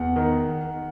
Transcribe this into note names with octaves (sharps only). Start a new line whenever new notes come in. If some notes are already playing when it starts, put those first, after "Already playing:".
Already playing: E2 F#5
D#3